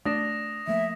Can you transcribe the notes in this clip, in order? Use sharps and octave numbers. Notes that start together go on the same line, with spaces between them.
A3 D4 D#6 A#6 E7
F3 A3 A#3 E5